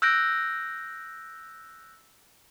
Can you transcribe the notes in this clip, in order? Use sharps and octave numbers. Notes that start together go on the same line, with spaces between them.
E6 F#6 G6 A#6 D7